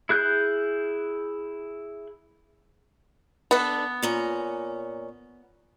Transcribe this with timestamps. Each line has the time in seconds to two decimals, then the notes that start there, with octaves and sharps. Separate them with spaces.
0.09 E4 G#4 F#6 G6
3.51 B3 D4 A4
4.02 A#2 C#4 A#5